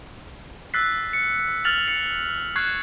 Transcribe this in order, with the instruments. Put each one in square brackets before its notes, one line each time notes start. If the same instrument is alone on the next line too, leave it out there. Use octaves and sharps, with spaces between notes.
[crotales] E6 F#6 A6 B6 C7
C#7
F6 A6 F7 F#7
C#7
C#6 F#6 G#6 C7